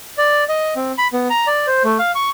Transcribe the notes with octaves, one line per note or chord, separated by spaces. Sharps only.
D5
D#5
C4
B5
B3
A#5
D5
C5
A3
F5
C#6